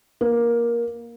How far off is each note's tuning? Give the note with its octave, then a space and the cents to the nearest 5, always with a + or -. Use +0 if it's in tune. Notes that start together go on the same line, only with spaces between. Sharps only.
A#3 +15